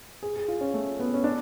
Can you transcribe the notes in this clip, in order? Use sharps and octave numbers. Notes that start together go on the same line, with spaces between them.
G#4
G#4
F4
C#4
A3
B3
C#4
D4